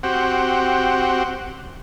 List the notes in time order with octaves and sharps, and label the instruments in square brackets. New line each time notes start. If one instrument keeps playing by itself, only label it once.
[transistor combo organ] C4 F#4 G4